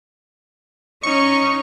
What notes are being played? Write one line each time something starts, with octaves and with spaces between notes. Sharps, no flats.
C#4 D#4 C#6